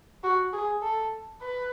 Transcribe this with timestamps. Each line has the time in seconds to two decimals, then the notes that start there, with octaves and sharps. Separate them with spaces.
0.24 F#4
0.53 G#4
0.83 A4
1.42 B4